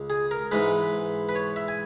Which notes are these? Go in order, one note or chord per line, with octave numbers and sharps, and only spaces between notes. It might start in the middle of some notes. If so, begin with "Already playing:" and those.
Already playing: C#2 C#3 G#3
G#4
A#4
G#2 E3 G#3 B4
B4
C#5
E5
G#5